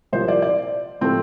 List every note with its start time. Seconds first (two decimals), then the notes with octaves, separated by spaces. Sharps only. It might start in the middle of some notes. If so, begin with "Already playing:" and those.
0.13 C2 A#2 F3 A#3 C5
0.28 D5
0.42 D5
1.01 A2 F3 A3 C4